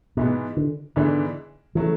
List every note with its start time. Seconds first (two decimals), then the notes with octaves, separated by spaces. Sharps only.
0.17 G#2 B2 E3 G#3 B3
0.57 D3
0.96 G#2 D3 E3 B3 D4
1.75 C#3 E3 F#3 A3